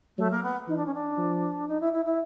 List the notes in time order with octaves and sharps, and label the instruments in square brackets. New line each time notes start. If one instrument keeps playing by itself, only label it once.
[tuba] F#3 [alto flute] A3
[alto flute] A#3
B3
[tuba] E3 [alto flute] D#4
[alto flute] D4
C#4
D4
[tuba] F3
[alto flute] D#4
E4
E4
E4